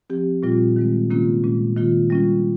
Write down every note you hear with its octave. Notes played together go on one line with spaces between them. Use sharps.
F3 C4 G4
A#2 G3 C4 F4
D#3 G#3 C4
C3 D#3 A#3 C#4 F4
A#2 G#3 C#4
D#3 A#3 F4
G3 C#4 F4